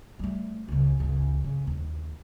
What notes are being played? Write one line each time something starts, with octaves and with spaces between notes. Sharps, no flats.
G3 A3
C#2 C#3
G1 C#2
C#3
D#2